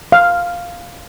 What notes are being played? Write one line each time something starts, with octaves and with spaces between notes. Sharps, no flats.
F5